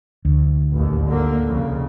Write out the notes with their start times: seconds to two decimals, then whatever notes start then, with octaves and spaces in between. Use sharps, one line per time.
0.25 D2
0.72 A1 D#2
1.07 G#1 D3 A#3
1.46 C2 F2 C#3